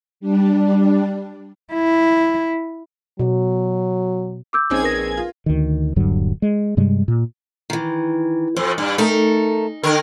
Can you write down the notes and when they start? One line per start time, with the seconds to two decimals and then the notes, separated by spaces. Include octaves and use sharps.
0.20 G3 D4
1.74 E4
3.19 B2 F#3
4.53 D6 E6 G6
4.70 A#1 C4 C#4 D#4 G#4 G#6
4.83 A#4 B4 A#6
5.17 F4
5.46 D2 D#3
5.96 D#1 G2 D3 F#3
6.42 G#3
6.77 G2 C3 G3 G#3
7.08 A#2
7.70 D#3 E3
8.56 F2 C5
8.78 G2 D5
8.98 A3 D#4 A4 A#4
9.83 D3 A#4